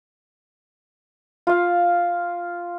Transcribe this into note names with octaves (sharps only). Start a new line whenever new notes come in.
F4 F5